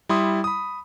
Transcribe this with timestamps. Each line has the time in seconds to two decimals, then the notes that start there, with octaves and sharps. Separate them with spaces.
0.09 G3 E4 C6 D#6
0.44 B5 D#6